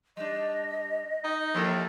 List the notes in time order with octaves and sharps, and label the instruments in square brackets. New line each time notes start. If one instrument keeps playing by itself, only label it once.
[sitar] G3 D4 [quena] D#5
[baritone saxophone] D#4
[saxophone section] D#2 [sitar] F3 E4 A4